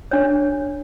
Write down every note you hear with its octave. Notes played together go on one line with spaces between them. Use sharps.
D4 C#5